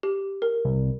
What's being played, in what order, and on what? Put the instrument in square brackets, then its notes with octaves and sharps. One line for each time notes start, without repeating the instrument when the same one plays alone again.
[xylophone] G4
A#4
[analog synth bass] C2